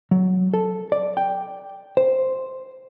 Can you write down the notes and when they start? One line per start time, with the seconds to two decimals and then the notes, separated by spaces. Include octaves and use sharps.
0.11 F#3
0.54 A4
0.92 D5
1.17 G5
1.97 C5